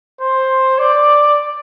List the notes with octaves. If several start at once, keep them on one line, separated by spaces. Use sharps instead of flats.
C5
D5